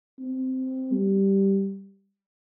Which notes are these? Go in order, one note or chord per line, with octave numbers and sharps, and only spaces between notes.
C4
G3